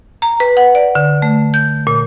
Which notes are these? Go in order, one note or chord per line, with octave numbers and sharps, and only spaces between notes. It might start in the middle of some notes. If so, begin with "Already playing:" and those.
A#5
B4
F#5
D5
D3
A3
G6
A#2